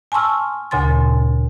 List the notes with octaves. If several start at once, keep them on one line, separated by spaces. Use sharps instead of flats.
G#5 A5 C6 C#6 E6 F6
D2 A#2 C#3 G#5 C6 A6